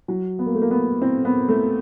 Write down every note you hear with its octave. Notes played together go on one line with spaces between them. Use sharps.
F#3
B3
A#3
A3
A#3
B3
C4
B3
A3